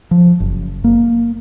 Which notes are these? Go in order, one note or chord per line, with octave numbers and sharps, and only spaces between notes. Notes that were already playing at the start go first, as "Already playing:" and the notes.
F3
F#1
A#3